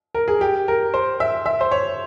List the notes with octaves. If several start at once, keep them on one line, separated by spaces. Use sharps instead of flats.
A#4
G#4
G4
A#4
C5
E5
E5
C5
C#5